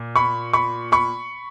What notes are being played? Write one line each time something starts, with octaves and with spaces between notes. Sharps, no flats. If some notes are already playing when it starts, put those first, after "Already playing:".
Already playing: A#2
B5 C#6
B5 C#6
B5 C#6